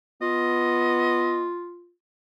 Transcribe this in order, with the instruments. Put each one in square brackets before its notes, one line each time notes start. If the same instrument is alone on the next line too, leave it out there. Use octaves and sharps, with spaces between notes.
[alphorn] B3 [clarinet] F4 [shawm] D#5